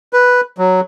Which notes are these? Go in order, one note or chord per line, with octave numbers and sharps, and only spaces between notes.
B4
F#3